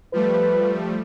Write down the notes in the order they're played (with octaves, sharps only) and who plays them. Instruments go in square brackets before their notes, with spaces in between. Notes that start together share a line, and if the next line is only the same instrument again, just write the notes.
[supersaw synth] F3 G3 A3 [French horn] B4